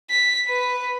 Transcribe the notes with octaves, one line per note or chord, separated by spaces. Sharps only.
B6
B4